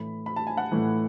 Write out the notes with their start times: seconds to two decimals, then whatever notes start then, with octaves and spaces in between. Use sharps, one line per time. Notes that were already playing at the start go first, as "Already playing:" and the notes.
Already playing: A2 E3 B5
0.26 B5
0.36 A5
0.47 G#5
0.57 F#5 A5
0.72 A2 E3